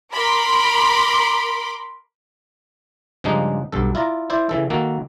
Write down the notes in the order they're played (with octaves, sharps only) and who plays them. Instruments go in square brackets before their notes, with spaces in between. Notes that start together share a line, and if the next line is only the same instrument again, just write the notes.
[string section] A#4 B5 C6 D6
[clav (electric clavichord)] G2 C#3 F3 G#3 D4 D#4
B1 G2 A4
E4 F4 D5 A#5
E4 C5 D5
C#3 E3 A4
D#3 A#3 F#4 A4